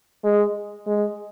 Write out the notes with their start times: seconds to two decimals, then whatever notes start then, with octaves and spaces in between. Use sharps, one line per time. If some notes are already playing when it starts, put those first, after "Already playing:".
0.24 G#3
0.87 G#3